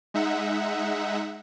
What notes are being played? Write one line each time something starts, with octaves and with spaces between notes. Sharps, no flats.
G#3 D#4 E5 F#5